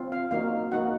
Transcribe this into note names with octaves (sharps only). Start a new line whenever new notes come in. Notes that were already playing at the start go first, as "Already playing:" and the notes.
Already playing: C4 F4
F5
A#3 D#4 F#4 F5
A#3 D#4 F#4 F#5